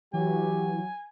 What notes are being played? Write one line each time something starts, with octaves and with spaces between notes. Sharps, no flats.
E3 F#3 F#4 G4 G#5